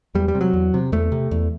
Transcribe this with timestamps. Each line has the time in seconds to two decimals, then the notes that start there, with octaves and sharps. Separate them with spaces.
0.15 E2 G3
0.28 G3
0.35 C3
0.41 F#3
0.53 E2
0.74 C3
0.92 E2 A3
1.12 C3
1.31 E2